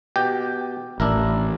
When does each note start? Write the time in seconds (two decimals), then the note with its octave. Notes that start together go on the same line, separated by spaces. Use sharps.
0.16 B2 G4 G5
1.00 A1 D4 E4 A#4